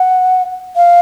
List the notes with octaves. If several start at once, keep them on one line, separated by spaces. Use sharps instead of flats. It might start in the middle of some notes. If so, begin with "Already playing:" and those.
Already playing: F#5
F5